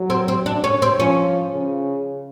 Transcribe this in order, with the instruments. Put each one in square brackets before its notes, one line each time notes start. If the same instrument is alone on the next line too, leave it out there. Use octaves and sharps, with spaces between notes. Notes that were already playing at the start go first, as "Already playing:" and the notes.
Already playing: [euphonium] F#3
[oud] C4
C4
D4
C#4
C4
[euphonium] F3 [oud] C#4
[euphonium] C#3